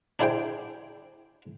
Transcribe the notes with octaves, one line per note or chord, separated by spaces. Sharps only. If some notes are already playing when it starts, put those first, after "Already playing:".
D4 E4 G#4 C5 G5